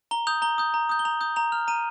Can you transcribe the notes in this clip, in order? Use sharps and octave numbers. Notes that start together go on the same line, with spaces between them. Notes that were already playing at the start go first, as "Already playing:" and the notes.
A#5 G7
D#6 G6 F7
A#5 G7
D#6 G6
A#5
D#6 G6
G7
A#5 F7
D#6 G6
A#5 F7
F6 F7
A#5 D#7